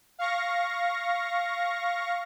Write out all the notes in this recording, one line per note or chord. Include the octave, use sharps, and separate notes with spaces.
F5 C#6 A#6